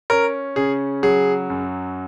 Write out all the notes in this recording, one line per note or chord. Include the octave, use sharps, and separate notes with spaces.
C#4 A#4
C#3 G#4
F#3 G#4
F#2